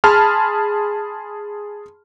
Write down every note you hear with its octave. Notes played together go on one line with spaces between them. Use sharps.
G#4 A5 B5 C6 F6